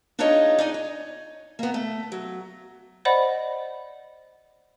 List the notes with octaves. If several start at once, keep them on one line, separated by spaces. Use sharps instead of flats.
D4 D#4 F4 G#4 C#5 D#5
D#4 D5 G#5
C#5
A#3 B3
A3
F#3
C5 D5 D#5 F#5 B5